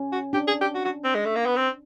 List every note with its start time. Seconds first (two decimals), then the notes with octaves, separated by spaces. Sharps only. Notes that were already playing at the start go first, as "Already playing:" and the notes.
Already playing: C#4
0.12 F#4
0.33 D4 G4
0.48 G#4
0.61 G4
0.75 F#4
0.85 F#4
1.04 C4
1.15 G#3
1.25 A3
1.36 A#3
1.46 B3
1.56 C4